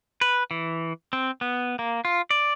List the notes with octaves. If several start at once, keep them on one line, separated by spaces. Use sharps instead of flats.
B4
E3
C4
B3
A#3
F4
D5